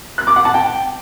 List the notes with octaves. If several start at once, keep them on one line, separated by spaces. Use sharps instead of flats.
F#6
D6
F#5
A5
G5